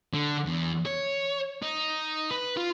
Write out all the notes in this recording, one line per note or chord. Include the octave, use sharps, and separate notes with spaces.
D3
E2
C#5
D#4
B4
F4